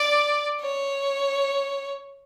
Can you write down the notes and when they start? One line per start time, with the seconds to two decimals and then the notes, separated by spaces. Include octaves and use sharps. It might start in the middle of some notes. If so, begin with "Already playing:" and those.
Already playing: D5
0.61 C#5